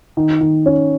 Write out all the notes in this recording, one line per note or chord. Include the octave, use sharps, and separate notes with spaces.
D#3
D#3
C#4